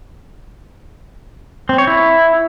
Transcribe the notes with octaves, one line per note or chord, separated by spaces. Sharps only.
C4
C#5
E4